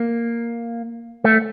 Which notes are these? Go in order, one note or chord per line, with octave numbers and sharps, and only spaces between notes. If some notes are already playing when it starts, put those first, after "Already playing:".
Already playing: A#3
A3